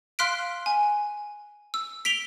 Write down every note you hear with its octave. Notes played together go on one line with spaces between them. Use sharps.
F5 C6 F6 F#6 B6 D7
G#5
E6
B6 D7 F7 G7